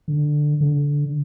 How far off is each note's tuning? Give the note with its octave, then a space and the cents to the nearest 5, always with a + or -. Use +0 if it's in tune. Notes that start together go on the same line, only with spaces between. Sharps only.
D3 +10
D3 -15